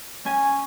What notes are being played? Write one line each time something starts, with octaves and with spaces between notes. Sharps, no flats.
C#4 G#5